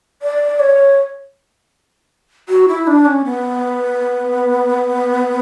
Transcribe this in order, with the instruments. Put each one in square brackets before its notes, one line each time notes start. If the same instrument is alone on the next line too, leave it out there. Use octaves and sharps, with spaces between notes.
[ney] D5
C#5
F#4
E4
D4
C#4
B3